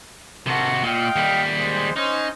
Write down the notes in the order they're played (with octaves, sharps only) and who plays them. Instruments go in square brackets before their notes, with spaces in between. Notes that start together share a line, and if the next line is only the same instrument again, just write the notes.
[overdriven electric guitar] C3 F#4 [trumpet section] A4 A#4
[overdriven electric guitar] A#2 [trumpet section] D#5 F5 G5
[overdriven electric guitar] D#2 G3
[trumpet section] G#3 C5
[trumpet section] C#4 C5 [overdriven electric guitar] D#4